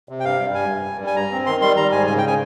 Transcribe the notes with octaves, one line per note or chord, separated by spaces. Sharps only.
C3
G5
G2 F5
G3
G2 G#5
G2
G2
G3
G#5
G2 A#5
C4
D#3 C6
G3 C6
G3 A#5
G#2 G#5
C#3 G#5
G5
C#3 G#5